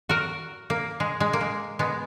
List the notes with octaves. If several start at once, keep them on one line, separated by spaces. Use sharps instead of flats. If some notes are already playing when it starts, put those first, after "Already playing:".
F#4 A#4
A#3
G#3
G#3
A#3
G#3
G#3 B3